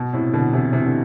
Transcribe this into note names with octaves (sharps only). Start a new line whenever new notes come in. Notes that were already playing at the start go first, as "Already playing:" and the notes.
Already playing: B2
A2 C3
B2 D3
C3 E3
C3 E3
D3